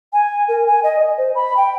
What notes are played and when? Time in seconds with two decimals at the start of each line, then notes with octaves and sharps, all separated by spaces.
0.13 G#5
0.48 A#4
0.67 G#5
0.84 D#5
0.99 D#5
1.18 C5
1.35 B5
1.57 G5